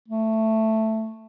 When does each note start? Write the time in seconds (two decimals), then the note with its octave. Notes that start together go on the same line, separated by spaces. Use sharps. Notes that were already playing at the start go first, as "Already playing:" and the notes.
0.08 A3